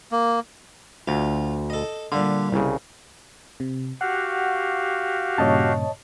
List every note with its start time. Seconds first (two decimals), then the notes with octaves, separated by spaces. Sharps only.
0.12 A#3
1.07 D2 F4
1.70 A4 D#5
2.12 A#2 D3 G3 F5
2.52 C2 C#3
3.60 C3
4.01 F#4 G4 F5 F#5
5.38 G2 A#2 C#3 C#5 D#5 A5